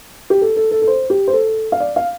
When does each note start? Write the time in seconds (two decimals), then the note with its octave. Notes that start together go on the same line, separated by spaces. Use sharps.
0.30 G4
0.41 A4
0.56 A4
0.71 A4
0.82 A4
0.88 C5
1.10 G4
1.28 C5
1.33 A4
1.72 F5
1.80 D5
1.96 F5